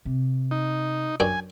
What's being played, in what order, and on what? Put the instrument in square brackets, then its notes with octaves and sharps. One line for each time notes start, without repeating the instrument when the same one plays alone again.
[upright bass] C3
[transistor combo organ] D#4
[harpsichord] F#2 D4 G5 [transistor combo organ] G#5